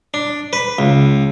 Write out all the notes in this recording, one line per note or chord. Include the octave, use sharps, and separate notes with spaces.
D4
B4
C#2